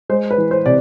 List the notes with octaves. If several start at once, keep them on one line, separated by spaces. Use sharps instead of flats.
G#3 C5
B4
E3
C5
C3 D5